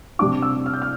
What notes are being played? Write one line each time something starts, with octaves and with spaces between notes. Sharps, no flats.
C3 G3 D4 D6
E6
F6
G6
F6